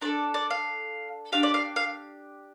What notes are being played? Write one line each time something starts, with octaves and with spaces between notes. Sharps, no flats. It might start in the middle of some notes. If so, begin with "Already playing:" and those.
D4 F4 A4 D5
D5
F5
D4 G4 F5
D5
F5
F5